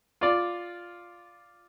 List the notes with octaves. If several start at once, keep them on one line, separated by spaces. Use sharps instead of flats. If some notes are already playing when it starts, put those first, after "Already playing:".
F4 D5